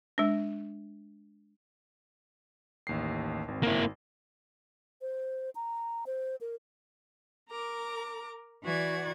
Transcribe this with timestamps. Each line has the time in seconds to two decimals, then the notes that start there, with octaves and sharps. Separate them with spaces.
0.18 G#3 D4
2.87 A1 D#2 C7
3.48 G#1 C4
3.63 A#3 E4
5.01 C5
5.55 A#5
6.06 C5
6.41 A#4
7.49 A#4 A#5 D6
8.64 E3 F#4 D5 C#6 G#6